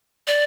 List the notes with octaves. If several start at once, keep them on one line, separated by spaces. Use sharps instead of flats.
D5